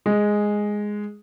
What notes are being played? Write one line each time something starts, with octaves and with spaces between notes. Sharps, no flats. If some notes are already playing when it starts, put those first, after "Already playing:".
G#3